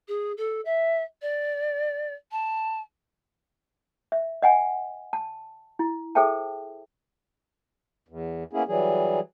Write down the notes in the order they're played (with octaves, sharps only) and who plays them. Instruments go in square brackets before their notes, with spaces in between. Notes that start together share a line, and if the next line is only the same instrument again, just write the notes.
[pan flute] G#4
A4
E5
D5
A5
[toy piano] E5
D#5 F#5 G#5
A5
E4
G#4 A4 C5 E5 G5 A5
[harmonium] E2
A#3 B3 C#4 E4 G#4
E3 F#3 G3 G#4